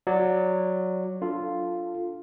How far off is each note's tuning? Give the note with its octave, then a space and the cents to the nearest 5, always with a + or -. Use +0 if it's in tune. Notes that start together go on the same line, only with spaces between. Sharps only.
F#3 -10 D5 +0
D4 +0 F4 +0 A4 +10